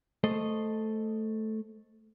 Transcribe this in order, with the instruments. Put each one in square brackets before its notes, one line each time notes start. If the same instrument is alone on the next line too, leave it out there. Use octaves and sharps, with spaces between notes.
[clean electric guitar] A3 A4 C5 D#5